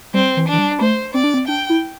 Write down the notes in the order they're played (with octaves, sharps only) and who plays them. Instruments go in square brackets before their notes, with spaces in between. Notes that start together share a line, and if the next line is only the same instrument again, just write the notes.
[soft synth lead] G3 [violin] C4
[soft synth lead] E3
[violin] D4
[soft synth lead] E3
G3
[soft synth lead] A3 [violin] C5
[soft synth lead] C4 [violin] D5
[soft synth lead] D4
C4
[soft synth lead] D4 [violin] G5
[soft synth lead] E4